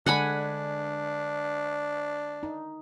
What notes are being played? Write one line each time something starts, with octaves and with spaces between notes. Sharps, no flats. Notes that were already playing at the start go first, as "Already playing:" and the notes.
D3 G#3 D4 F#5 G#5 B5
D#4